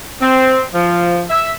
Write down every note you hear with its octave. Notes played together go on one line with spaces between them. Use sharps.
C4
F3
E5